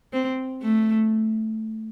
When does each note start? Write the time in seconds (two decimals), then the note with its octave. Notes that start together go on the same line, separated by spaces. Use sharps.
0.13 C4
0.63 A3